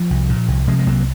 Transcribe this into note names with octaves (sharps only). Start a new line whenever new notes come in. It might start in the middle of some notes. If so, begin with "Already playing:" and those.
Already playing: F3
C2
A#2
C2
C3 F3 G#3
G#3
C2 F#3 A#3